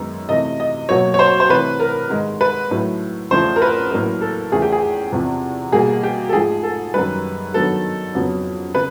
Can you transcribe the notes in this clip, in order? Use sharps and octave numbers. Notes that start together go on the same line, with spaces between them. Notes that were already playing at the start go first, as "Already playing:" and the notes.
Already playing: F#2 D#3 G#3 B3
C3 E3 A3 D#5
D#5
B2 F#3 A#3 C#5
C#5
C5
C5
C3 E3 A3 B4
A#4
G#2 D#3 G#3
B4
A2 F#3 A3
E2 C#3 F3 A3 C5
A#4
B4
A2 F#3 A#3 A#4
A4
E2 C#3 F3 A3 G#4
G4
G#4
E2 C3 F3
B2 G3 A#3 G#4
G4
A4
G#2 F3 A3 G#4
A4
F#2 D#3 G3 B4
G2 D#3 F#3 B3 A4
F2 C#3 F#3 B3
C#3 B4